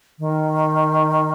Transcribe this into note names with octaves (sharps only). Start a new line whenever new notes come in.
D#3